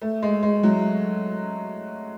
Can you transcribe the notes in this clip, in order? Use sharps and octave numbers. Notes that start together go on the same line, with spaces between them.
A3
G#3
G#3
F#3